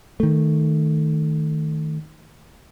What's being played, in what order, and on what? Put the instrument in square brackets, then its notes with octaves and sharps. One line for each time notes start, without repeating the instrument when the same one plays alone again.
[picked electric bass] D#3 A3